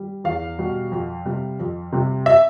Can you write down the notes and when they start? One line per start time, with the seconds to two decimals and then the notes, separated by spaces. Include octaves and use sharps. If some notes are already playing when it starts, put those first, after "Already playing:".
Already playing: G3
0.24 E2 F5
0.59 B2 G3
0.92 F2
1.26 C3 G3
1.59 F2
1.92 C3 G3
2.26 E5